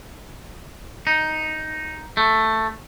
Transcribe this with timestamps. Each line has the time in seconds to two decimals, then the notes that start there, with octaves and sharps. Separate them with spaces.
1.07 D#4
2.17 A3